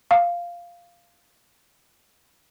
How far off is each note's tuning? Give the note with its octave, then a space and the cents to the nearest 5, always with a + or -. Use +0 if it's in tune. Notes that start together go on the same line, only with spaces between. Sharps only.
F5 -5